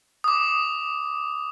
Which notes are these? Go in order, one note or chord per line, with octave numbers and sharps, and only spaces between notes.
D6 D#6